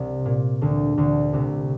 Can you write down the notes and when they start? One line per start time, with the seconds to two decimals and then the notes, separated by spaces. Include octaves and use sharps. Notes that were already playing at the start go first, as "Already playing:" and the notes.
Already playing: C2 C3
0.25 A#2
0.61 D2 D3
0.98 D2 D3
1.33 C2 C3